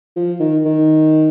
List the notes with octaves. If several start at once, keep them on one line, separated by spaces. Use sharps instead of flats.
F3
D#3
D#3